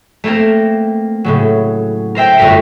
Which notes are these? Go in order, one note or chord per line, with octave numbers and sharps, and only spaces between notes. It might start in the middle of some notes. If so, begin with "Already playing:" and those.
A3 A#3 C4 A4 A#4
A2 C#3 F#3
A#4 C5 E5 G5
G1 F#2 A3 A#4 B6 E7